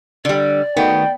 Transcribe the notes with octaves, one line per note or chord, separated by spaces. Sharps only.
D3 G3 D5
D#3 A3 B3 F#4 G5